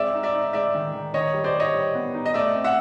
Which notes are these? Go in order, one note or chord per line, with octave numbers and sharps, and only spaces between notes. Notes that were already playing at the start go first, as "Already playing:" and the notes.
Already playing: G#3 C4 D5 E5
D#4
D5 E5
D#4
G#3 D5 E5
D#3
D#3
D#3 C#5 D#5
G3
C5 D5
G3 C#5 D#5
G3
B3
D#4
D#5
A3 D5 E5
C4
E5 F#5